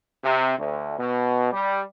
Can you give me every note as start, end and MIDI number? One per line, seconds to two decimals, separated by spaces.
0.24 0.56 48
0.58 0.98 38
0.99 1.49 47
1.53 1.83 55